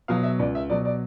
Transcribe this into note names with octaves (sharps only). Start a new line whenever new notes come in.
B2 F#3 F5
E5
C#2 D5
E5
B2 F#3 D5
D5